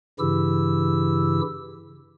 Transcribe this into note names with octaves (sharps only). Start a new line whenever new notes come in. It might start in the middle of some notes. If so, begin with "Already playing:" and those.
G2 C#3 E3 E4 G4 E6